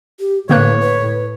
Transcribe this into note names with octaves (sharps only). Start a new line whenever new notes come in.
G4
A2 D3 A#3 B4 C#5 F#6
B4